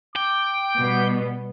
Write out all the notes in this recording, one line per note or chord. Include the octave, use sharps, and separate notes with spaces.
G5 D6
B2 G3 B3